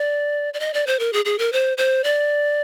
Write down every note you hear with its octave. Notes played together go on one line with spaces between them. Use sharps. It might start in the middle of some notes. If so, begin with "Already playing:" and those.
Already playing: D5
D5
D#5
D5
C5
A#4
G#4
G#4
A#4
C5
C5
D5